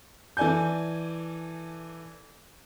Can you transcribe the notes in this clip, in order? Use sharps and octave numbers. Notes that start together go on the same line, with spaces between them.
E3 A4 D5 G#5 G6